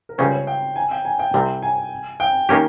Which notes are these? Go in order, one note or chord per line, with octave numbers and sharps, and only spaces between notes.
A#4
C#2 C#3 G3 C#4 C5
C#5
G5
G#5
G5
G#5
G5
C2 C3 G3 C4
G#5
G5
D#3 A#3 C#4 G4